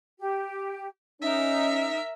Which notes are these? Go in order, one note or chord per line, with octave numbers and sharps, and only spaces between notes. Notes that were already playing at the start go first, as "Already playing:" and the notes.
G4
C#4 D#4 A#4 E5